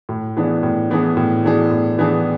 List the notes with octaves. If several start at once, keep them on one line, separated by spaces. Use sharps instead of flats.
A2
E3 B3 D4 G#4
A2
E3 B3 D4 G#4
A2
E3 B3 D4 G#4
A2
E3 B3 D4 G#4